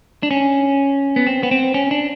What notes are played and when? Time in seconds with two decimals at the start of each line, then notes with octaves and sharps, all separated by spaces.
0.23 D4
0.31 C#4
1.16 B3
1.27 C4
1.43 B3
1.51 C4
1.74 C#4
1.91 D4